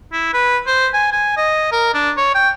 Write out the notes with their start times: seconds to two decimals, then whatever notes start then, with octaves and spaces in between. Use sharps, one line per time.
0.13 E4
0.34 B4
0.67 C5
0.94 G#5
1.12 G#5
1.37 D#5
1.72 A#4
1.94 D4
2.17 C#5
2.35 G5